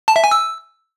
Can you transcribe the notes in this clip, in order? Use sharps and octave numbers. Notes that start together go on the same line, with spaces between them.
A5
E5
G#5
E6